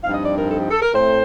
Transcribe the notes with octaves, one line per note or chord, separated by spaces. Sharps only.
G2 F3 C4 D#4 F5
D#5
D5
A#4
A4
G4
A4
A#4
A2 A3 C4 C5